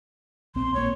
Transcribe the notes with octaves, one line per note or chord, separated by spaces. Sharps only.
A#1 C4 C6
A#1 A#3 C#5